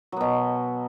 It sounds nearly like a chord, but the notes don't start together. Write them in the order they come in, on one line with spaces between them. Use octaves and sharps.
F#3 B3 B2